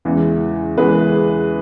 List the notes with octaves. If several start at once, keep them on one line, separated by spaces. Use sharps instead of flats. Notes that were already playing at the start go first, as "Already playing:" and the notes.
E2 C#3 E3 G#3
E2 C#3 E3 G#3 G#4 B4